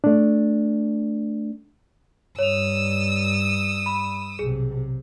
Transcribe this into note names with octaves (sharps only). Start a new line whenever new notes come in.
A3 D4
G2 C#5 D#6 E6 F7
B5
B1 C3 G#4